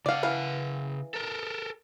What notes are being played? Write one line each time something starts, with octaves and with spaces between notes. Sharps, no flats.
C#3 D5 F5 F#5
E3 B4 F5
A4 A#4